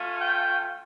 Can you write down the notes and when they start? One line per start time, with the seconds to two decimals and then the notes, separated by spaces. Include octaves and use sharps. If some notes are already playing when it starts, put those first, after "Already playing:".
Already playing: A3 C#4 F4
0.20 G5